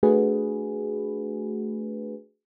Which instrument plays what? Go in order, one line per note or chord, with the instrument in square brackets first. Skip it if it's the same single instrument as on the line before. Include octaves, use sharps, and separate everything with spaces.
[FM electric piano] A3 D4 F#4 G#4 B4